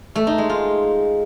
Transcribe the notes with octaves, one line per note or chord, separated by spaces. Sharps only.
A3
D#4
G#3
F4